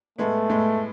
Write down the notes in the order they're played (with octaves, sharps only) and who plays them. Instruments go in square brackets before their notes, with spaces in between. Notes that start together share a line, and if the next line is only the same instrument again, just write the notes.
[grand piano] A2 G#3 B3 [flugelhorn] A3
[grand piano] A2 G#3 B3